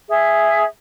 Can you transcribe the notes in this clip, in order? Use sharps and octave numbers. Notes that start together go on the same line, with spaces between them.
G#4 E5